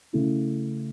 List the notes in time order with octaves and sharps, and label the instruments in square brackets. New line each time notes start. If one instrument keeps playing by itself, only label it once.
[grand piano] C#3 A3 E4